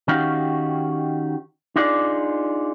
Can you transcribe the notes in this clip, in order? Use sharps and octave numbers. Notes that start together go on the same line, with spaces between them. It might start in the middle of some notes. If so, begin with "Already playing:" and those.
D#3 C#4 D#4 F#4 G4 F5
D4 D#4 F4 G#4 D5